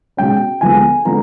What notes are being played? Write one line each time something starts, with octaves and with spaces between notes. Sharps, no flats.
B2 G#3 C#4 G5
D2 D3 F3 G#3 B3 G#5
D3 F3 G#3 B3 A#5